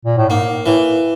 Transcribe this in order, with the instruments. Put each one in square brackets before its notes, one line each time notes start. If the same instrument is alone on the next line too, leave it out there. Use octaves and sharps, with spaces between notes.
[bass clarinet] A#2
A2
[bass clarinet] G#2 [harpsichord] A#3
[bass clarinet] A2 [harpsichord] E3